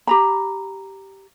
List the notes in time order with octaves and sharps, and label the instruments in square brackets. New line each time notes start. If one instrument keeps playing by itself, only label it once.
[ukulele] G4 A#5 B5